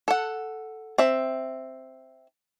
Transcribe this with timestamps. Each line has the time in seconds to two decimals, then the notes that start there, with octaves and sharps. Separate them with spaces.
0.08 A4 F#5
0.98 C4 E5